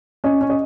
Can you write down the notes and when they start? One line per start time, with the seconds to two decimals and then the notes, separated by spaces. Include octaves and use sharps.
0.24 C#4 D#5
0.41 C#4
0.50 D#5